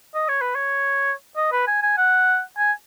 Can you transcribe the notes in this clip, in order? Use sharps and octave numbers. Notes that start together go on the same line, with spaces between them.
D#5
C#5
B4
C#5
D#5
B4
G#5
G#5
F#5
G#5